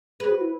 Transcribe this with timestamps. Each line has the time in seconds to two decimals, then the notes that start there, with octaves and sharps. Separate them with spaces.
0.20 G#4 B4
0.31 F#4
0.41 E4